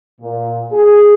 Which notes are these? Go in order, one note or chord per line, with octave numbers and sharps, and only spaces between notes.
A#2
G#4